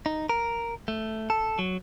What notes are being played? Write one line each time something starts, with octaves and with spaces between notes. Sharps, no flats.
D#4
A#4
A3
A4
F#3